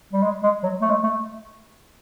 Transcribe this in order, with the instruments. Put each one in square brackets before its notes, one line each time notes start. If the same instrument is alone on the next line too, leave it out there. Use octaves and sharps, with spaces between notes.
[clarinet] G3
G#3
G#3
F#3
A3
G#3
A3